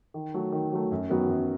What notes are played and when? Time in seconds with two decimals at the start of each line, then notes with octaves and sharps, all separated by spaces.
0.14 D#3
0.34 F#3 A3
0.52 D#3
0.73 F#3 A3
0.92 F#2
1.10 D#3 F#3 B3 F#4
1.29 F#2